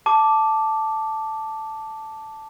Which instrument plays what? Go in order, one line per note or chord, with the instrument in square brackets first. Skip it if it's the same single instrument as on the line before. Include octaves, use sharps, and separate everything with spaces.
[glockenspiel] A5 D6